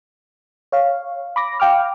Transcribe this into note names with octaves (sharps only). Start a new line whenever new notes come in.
C#5 F5
B5 D6 A#6
F5 G5 D6 F6